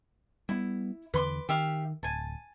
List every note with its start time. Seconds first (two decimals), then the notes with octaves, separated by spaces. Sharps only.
0.49 G3 B3 E4
1.14 E2 D3 E3 B4 C6 D6
1.49 D#3 G4 E5 F5
2.03 D1 G#5 A5